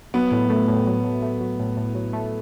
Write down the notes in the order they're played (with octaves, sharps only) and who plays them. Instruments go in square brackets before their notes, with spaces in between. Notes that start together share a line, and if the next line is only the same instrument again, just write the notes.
[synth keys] F#3 [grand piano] B3
[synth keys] A2
A3
A2
F#3
A2
A3
F#3
A2
A2
F#3
A3